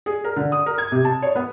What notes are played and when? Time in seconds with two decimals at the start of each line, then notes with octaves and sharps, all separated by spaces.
0.06 G#4
0.24 A#4
0.36 D3
0.52 D#6
0.66 A#4
0.78 G#6
0.92 C3
1.05 A5
1.22 C#5
1.35 B3